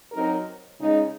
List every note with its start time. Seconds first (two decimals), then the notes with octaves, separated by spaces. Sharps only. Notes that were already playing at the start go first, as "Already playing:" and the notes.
0.12 F#3 C4 D#4 A#4
0.78 C#3 G#3 D#4